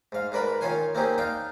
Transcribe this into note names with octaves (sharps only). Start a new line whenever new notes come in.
G#2 F5
G#2 D4 A#4 B4 B5
D#3 C#4 F4 C#5 G#5 C6
A#3 C4 C#4 D#4 G4 G#4
D4 D#4 F5 G5